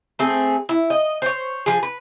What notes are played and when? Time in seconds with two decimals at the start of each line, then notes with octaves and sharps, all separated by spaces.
0.19 A3 C4 G#4
0.69 E4
0.90 D#5
1.22 C5 C#5
1.66 F3 G#4
1.83 B4